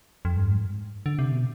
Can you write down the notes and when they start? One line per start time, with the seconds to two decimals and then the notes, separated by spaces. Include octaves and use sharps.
0.25 F2
0.36 G2
0.48 G#2
1.06 D3
1.19 C3
1.32 B2